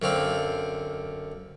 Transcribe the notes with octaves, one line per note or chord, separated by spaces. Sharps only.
F#2 D3 C4 F5